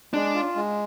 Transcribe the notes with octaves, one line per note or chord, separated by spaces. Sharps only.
G#3 D4
F4
G#3